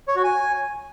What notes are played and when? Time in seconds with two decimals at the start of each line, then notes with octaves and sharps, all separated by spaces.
0.08 C#5
0.16 F#4
0.24 G#5